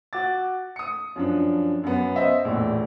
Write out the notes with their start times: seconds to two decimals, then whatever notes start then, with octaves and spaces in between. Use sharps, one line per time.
0.13 F#4 D6 A6
0.76 D#6 C#7
1.16 F#2 F3 D4
1.84 F#2 B3
2.16 C5 D#5 E5
2.45 A#1 E2 A2